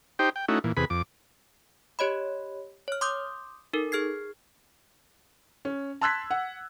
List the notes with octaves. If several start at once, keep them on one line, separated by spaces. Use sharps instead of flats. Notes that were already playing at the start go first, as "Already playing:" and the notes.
D#4 G4 C5 G5
G5
A3 C#4 D#4 E4 F#4
A#2 E3
E2 C3 G#4 B4 B5
F2 D6
G4 C#5 D#5 B5
C#5 F6
C6 D6 D#6 G6
D#4 A4 A#4
G#4 F6 G#6 C7
C#4
A5 C6 E6 F#6 G#6 B6
F#5